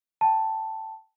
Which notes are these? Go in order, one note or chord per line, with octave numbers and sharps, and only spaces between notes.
G5 A5